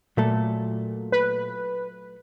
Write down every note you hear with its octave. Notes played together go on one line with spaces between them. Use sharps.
A#2 F#3 A3 A4
B4